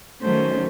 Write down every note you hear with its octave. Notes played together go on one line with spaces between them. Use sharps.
D#3 F#3 A3 C#4 C5